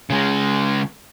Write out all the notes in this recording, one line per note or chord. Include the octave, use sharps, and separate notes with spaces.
C#3 G#3